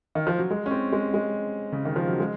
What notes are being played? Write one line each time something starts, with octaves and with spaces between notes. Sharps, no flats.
D#3
F3
F#3
G#3
C#4
C4
G#3
G#3
C#3
D#3
F3
F#3
G#3